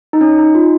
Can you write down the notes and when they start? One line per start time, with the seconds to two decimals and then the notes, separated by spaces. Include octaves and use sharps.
0.13 D#4
0.21 C#4
0.38 D#4
0.55 F4